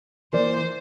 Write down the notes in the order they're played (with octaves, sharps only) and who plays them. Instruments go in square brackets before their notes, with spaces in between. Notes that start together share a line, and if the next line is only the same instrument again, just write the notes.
[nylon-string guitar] E3 A#3 E4 A#4 D5 [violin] C5